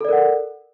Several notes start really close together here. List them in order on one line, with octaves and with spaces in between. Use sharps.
A4 D5 A#4 F#5